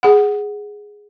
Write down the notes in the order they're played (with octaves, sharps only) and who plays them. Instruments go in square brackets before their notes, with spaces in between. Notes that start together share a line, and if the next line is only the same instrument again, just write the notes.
[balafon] G#4 F#5